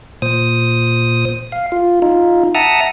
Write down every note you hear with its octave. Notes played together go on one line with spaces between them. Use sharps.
A#2 C5 D#6
F5
F4
D#4 F4
E5 F#5 A5 A#5 D#6